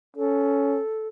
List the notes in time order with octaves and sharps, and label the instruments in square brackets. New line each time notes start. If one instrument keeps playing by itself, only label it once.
[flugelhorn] C#4 [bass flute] A4